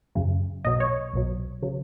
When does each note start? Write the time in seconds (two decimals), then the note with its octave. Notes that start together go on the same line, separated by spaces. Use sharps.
0.15 F#2 C#3 F#3
0.65 B1 B2 F#3 D#5
0.80 C#5
1.13 B1 B2 F#3
1.63 C#3 F#3